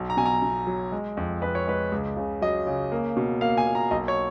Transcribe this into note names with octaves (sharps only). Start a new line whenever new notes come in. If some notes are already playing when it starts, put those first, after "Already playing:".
Already playing: B1
A#5
B2 G#5
A#5
B2
F#3
G#3
F2
F2 B4
C#5
G#3 B4
C#2
C#3
F#3 D#5
C#3
A#3
B2
A#3 F5
G#5
A#3
A#5
B1 D#5
C#5